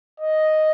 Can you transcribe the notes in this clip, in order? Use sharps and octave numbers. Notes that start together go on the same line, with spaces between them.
D#5